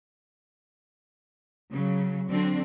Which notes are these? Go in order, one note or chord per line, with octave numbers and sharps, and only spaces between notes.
C#3 F#3
D3 F#3 C4 D4